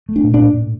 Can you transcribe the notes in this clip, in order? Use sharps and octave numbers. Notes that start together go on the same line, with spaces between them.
A3
D4
A#2
D4
A2
A2